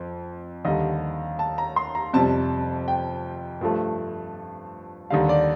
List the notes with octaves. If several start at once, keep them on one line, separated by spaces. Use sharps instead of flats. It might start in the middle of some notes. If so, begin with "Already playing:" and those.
Already playing: F2
D#2 D3 G3 D#5
A5
A#5
C6
A#5
F2 C3 G3 A5
G5
G2 F3 A3
D#2 D3 G3 F5
D5